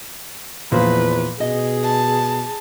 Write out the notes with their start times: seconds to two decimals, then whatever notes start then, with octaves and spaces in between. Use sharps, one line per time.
0.72 E2 A#2 F3 B4
1.40 B2 G#4 D#5
1.83 A5